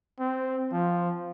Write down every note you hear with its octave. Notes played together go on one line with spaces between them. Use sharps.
C4
F3